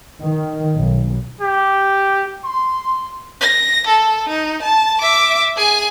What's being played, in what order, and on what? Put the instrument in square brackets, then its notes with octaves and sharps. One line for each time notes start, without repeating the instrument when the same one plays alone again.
[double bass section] D#3
B1
[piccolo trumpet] G4
[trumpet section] C6
[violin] A#6
A4
D#4
A5
E5 D6
G#4 G#5